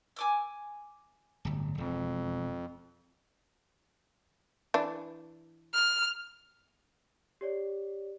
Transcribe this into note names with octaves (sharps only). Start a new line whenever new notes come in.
G#5 D6 E6
D1 G1
E1 F2
E3 D4
F6
G4 C#5 D5